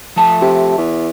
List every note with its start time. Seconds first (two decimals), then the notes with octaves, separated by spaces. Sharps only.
0.16 F3 A3 A5
0.41 C3
0.78 E2